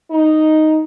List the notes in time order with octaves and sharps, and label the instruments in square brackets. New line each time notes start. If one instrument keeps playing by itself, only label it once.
[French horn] D#4